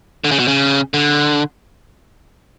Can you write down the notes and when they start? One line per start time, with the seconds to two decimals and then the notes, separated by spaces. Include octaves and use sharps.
0.24 D3
0.32 C#3
0.39 B2
0.48 C#3
0.94 D3